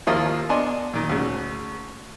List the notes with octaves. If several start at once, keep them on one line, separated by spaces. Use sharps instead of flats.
D#2 F3 A#3 E4 F4 D#6
B3 D4 D#5 G#5 C6
A#2 D#3
D2 C#3